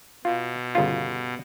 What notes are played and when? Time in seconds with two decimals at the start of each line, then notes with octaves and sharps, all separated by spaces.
0.25 B2 F4
0.75 G1 C#3 F4